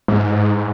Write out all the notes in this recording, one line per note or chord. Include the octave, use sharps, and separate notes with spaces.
G#2